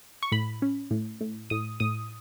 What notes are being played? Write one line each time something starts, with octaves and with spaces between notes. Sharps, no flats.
C#6
A2 B5
C#4
A2
A2
A2 D#6
A2 D#6